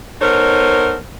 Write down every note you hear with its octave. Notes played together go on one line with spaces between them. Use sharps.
B3 D#4 A4 A#4 C5 C#5